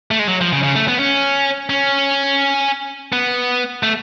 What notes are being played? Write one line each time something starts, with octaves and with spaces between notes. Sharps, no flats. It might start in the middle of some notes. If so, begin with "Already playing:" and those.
A3
G#3
F#3
F3
C#3
C#3
A3
B3
C#4
C#4
B3
A3